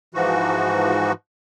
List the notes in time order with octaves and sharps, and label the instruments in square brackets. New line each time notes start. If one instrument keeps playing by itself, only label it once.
[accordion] G#2 E3 F3 F#4